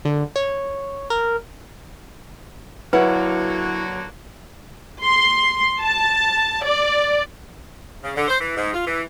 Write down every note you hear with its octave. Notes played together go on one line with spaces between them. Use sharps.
D3
C#5
A#4
D3 F#3 A#3 E4 F#4 B4 C#5 F#5
C6
A5
D5
C#3
D3
C5
E3
G#2
F4
E3